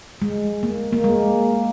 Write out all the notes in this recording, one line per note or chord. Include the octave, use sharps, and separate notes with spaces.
G#3
A#3
A#3
G#3